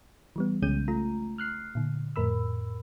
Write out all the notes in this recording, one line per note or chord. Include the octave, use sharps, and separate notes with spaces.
E3 G3 B3
C2 C#3 G#3 C#4 G6 D#7
A3 F4 A#5
F6 F#6 C7
A#2 D3
F2 A2 A#4 B5 E6